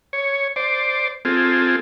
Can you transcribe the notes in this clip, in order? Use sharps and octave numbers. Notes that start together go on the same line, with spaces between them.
C#5
C5 D5
C4 F4 G#4 A4